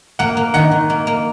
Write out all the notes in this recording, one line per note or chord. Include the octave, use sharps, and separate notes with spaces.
A#3 F#5
A#3
D#3 F#5
D#3
A#3
A#3